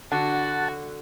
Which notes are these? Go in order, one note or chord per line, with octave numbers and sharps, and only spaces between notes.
D3 F#4 F#5 A5